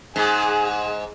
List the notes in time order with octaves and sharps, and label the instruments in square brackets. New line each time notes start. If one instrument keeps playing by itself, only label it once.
[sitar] G#2 [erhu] G#4